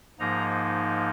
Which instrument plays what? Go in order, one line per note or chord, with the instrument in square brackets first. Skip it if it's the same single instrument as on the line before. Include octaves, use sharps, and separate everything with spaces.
[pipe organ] G#2 F3 A#3 D#4 A#5